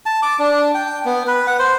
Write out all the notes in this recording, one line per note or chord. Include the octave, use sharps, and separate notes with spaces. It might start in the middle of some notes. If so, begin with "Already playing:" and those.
A5
D6
D4
G5
B3
B4
F#5
C5